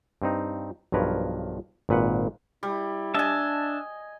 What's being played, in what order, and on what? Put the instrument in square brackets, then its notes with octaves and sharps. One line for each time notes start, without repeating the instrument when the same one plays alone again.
[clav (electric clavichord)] G2 C4 D#4
B1 G2 F3 A#4 B4 C#5
G#1 A#2 B4 F#5
[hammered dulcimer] G3 [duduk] E4
[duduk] D4 [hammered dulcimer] D#5 G#5 [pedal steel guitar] E5 A5